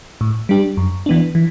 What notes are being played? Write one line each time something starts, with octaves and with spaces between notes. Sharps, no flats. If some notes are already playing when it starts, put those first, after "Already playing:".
A2
G3 D4 G4
F#2
E3 B3 D4
E3